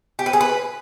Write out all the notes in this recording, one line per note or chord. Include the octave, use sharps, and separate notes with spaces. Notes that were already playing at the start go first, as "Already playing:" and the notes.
G4
B4
G#4
B4